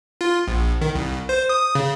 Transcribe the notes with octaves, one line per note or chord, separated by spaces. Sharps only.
F4
A#1
D#3
C2
C5
D#6
C#3